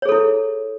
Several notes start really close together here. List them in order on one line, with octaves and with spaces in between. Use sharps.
C#5 G#4 A4 E4